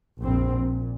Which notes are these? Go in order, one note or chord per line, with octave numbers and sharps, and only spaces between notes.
A#1 F2 C4
A#2